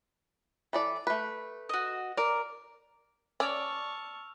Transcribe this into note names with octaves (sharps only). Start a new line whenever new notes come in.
E3 A4 D5
A3 B4
F#4 D#5
A#4 D5
C#4 D5 A5 C#6 E6 F6 F7